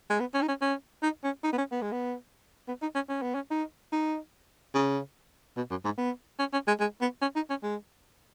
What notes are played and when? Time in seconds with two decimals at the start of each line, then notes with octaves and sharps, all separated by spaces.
0.10 G#3
0.20 B3
0.34 C#4
0.42 D#4
0.48 C#4
0.61 C#4
1.03 D#4
1.24 C#4
1.43 D#4
1.53 B3
1.58 C#4
1.72 B3
1.82 G#3
1.92 B3
2.68 B3
2.82 D#4
2.95 C#4
3.09 C#4
3.22 B3
3.35 C#4
3.51 D#4
3.92 D#4
4.74 C#3
5.57 B2
5.70 F#2
5.85 G#2
5.98 B3
6.39 C#4
6.53 C#4
6.67 G#3
6.80 G#3
7.01 B3
7.21 C#4
7.36 D#4
7.50 C#4
7.63 G#3